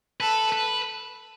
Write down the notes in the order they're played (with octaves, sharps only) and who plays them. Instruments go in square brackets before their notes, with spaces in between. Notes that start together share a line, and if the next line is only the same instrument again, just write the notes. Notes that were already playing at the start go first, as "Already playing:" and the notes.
[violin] A4 [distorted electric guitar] B4
[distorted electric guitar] B4